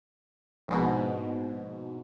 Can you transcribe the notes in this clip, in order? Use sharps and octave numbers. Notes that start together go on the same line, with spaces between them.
A#1 G#2 B2